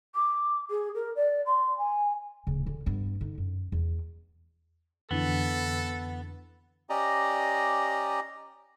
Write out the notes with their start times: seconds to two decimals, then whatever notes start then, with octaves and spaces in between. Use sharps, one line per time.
0.15 D6
0.70 G#4
0.94 A#4
1.15 D5
1.46 C6
1.77 G#5
2.47 D1 C#3
2.66 D3
2.86 G2 B3
3.21 D3 D#4
3.38 F#2
3.72 E2
5.11 F2 D3 E3 B3 A4
6.89 C#4 G4 D5 D#5 A#5